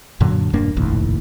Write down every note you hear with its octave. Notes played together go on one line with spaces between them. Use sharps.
F#2 A#2 D3 F#3
E1 G2 A#3 D4
F1 A#1 D#2 A2